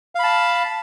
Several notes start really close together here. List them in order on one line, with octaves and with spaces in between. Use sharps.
F5 B5 A5